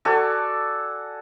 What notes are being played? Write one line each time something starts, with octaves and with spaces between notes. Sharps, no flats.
F#4 A4 D5 G#5